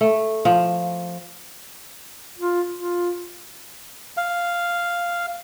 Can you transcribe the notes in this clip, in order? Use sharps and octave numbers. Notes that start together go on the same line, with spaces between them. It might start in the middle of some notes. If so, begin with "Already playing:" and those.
A3
F3
F4
F4
F5